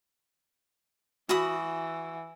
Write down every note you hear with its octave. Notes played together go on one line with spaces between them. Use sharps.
E3 F#4 B5 D#6